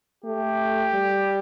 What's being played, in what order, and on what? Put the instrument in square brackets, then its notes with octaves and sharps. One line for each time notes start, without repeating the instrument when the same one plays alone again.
[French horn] A3 [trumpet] G4
[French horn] G3